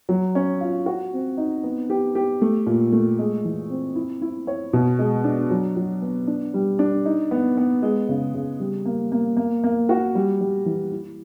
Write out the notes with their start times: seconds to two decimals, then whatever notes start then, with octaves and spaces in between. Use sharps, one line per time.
0.09 F#3
0.35 C#4
0.61 F4
0.86 F#4
1.13 C4
1.37 D#4
1.63 B3
1.90 G4
2.15 G4
2.41 A3
2.66 A#2
2.92 A3
3.19 G#3
3.44 E3
3.69 C4
3.95 E4
4.22 E4
4.47 C#5
4.73 B2
4.99 G#3
5.24 D4
5.50 F#3
5.76 F#3
6.02 B3
6.27 D4
6.54 G3
6.79 D4
7.06 D#4
7.31 B3
7.57 B3
7.82 G#3
8.09 C#3
8.34 C#3
8.60 G3
8.85 A#3
9.12 A#3
9.37 A#3
9.64 A#3
9.89 F#4
10.15 G3
10.41 G3
10.66 E3
10.92 E4